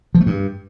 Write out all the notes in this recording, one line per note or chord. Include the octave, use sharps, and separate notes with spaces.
F3
A3
G2